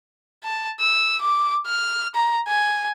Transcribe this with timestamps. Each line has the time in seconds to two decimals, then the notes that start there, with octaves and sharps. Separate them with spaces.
0.44 A5
0.80 E6
1.21 D6
1.66 F6
2.15 A#5
2.48 G#5